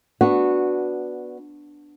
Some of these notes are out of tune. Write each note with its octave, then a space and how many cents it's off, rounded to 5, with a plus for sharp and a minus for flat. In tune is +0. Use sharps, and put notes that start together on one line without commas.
B3 +0 D4 +0 F#4 -10